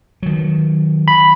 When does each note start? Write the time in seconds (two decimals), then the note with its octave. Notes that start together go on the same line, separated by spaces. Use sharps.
0.23 D#3 F#3
1.08 B5